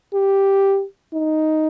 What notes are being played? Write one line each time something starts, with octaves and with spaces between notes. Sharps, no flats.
G4
D#4